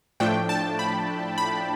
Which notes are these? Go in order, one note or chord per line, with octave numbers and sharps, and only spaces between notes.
A2 F3 A3 D4 G5
A5
B5
B5